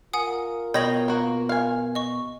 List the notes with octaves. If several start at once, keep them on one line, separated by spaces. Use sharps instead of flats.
F4 A#4 F#5 G#5 D#6
B2 C#5 D#5 G5 G#6 A#6 F#7
A#3 F#4
F5 G#5
D#5 C#6